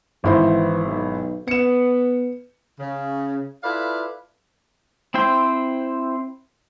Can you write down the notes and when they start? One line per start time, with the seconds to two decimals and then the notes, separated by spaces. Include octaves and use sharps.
0.24 G#1 E3 E4 C5
0.86 B1
1.48 B3 C#7 E7
2.79 C#3
3.63 E4 F4 A4 B4 D5 F5
5.14 C4 E4 C5 G5